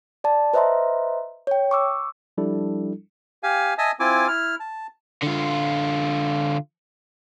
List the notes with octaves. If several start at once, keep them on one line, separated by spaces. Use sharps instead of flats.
D5 A5
B4 C5 D#5 E5 A#5 C6
C#5 G5
C#6 D6 E6
F3 G3 D4 E4 A4
G4 F5 G#5
D#5 E5 G#5 A5 D#6
C4 E4 F4 G#5 D6
E4 F6
A5
D3 F4